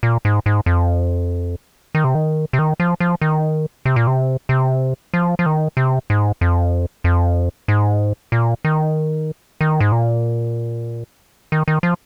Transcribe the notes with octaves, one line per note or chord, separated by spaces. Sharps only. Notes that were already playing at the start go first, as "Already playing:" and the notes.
A#2
G#2
G#2
F2
D#3
C3
D#3
C3
D#3
F3
F3
D#3
C3
A#2
C3
C3
F3
F3
D#3
C3
G#2
F2
F2
G#2
A#2
D#3
D#3
G#2
A#2
D#3
D#3
F3